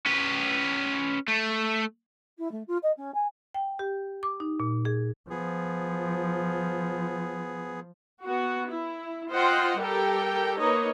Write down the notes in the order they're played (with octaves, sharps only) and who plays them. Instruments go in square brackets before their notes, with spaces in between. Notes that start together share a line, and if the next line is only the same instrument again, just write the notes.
[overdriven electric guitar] C#4 B4
A3
[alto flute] E4
A3
F4
D#5
C#4
G#5
[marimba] G5
G4
D6
D#4
A#2
G#4
[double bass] F3 [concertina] B3 G#4
[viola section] B3 F#4
E4
F4 C5 D#5 F#5 G5
G3 G4 A4 A#4 G5
A#3 D#4 B4 C#5 D#5